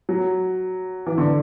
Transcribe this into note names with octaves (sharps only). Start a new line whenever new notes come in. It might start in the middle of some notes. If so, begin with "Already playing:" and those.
F#3
E3
D3